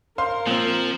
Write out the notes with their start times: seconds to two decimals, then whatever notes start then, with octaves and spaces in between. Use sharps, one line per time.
0.18 A#4 C5 F5 C6
0.47 A#2 F3 C4